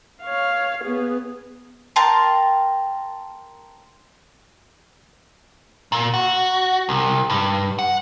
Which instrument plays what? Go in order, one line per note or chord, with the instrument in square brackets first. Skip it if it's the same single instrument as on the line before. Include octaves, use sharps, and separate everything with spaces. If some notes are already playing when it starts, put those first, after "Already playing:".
[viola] C#5 F5
B3 G#4
[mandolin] A#4 G5 A5 C6
[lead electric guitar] A#2
F#4
C2
G2
F#5